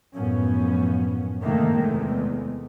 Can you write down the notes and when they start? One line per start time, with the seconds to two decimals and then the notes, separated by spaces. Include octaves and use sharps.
0.15 A1 F#2 A2 F3 B3 C#4
1.43 G2 C3 D#3 A3 A#3
1.78 E2 C3 G#3 A3